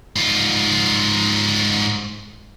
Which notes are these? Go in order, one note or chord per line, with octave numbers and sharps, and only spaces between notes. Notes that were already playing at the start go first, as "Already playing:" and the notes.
G#2 F4